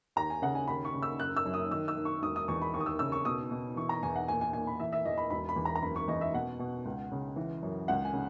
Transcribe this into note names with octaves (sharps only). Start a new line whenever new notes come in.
D#2 A#5
G#5
C#3 F#5
G#5
D#2 B5
C#6
C#3
E6
F#1 F#6
E6
F#2
D#6
D#3 E6
E6
D#3
C#6
E1 D#6
D#6
E2 C#6
B5
D#2 C#6
D#6
E6
C#3 E6
C#6
B2 D#6
B2
E3 C#6
A#5
E2 G#5
F#5
A#2 G#5
G#5
A#2 G#5
B5
E3 E5
E5
E2 D#5
B5
E1 B5
B5
E2
A#5
A#5
F#1 B5
C#6
E2 D#5
E5
B2 F#5
B2
C#2
C#3
E3
F#2
C#2 F#5
G#5
C#3